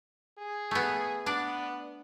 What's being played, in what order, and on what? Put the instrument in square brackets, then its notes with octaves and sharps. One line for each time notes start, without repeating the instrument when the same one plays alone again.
[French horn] G#4
[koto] A3 B3
[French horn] B3 [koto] D4 D5